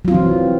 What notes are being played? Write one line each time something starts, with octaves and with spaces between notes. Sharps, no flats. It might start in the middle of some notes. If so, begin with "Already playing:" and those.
E3 F#3 C4 F4